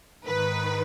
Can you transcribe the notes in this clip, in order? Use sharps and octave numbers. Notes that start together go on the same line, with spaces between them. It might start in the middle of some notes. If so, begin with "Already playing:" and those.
G#2 D#3 B4